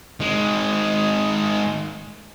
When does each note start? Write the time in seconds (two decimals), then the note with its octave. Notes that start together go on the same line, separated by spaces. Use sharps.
0.20 D#3 G#3